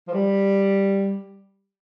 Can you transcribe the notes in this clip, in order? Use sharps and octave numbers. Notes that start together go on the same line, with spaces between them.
F3
G3